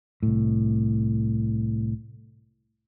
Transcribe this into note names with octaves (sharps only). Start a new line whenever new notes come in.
C2 A2